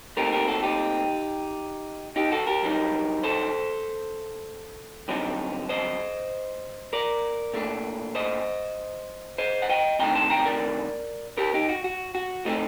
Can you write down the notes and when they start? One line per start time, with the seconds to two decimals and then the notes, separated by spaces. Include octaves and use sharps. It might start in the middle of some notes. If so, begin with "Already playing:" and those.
0.17 A#2 A3 C4 D#4 G4 A#4
0.32 G4 A#4
0.48 F#4 A4
0.63 D#4 G4
2.16 D#4 G4
2.32 F#4 A4
2.47 G4 A#4
2.62 G2 F#3 C4 D#4
3.24 A4 C5
5.08 G2 D3 F#3 C4 D#4
5.69 C5 D#5
6.93 A#4 D5
7.54 A#2 A3 D4
8.15 C5 D#5
9.38 C5 D#5
9.62 F#5
9.70 D#5 G5
9.99 C3 D#3 A3 D4 G5 A#5
10.15 A5 C6
10.30 G5 A#5
10.46 A#4 D5
11.38 G4 A#4
11.54 D#4 G4
11.69 F#4
11.84 F#4
12.15 F#4
12.45 A2 A3 C4 D#4